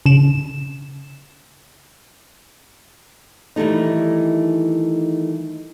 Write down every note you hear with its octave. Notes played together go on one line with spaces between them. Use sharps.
C#3 E7
D#3 E3 G3 A3 D#4